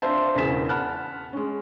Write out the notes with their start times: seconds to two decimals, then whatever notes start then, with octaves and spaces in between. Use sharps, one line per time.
0.02 C4 D4 F4 C5 E5 A5
0.35 E1 E2 C#3 B6 E7
0.69 F#5 A5 B5 F6 F#6
1.33 G#3 C#4